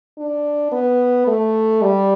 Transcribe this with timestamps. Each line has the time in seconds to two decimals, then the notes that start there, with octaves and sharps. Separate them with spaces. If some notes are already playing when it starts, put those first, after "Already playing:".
0.18 D4
0.72 B3
1.27 A3
1.82 G3